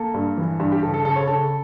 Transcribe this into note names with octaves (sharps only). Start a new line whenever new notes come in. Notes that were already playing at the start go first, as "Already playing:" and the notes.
Already playing: A#3 A4
G2
E3
G2
G4
C#3 A4
A4
C#3 A4
C#5
C#3 A4